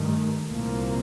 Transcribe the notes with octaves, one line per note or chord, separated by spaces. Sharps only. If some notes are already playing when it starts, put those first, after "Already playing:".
Already playing: G2 D#3 A3
C2 A#2 F3 A#3